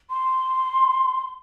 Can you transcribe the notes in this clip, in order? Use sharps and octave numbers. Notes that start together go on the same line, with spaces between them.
C6